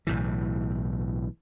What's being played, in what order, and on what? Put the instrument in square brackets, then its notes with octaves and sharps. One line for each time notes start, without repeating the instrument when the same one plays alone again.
[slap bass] B1 A2 E3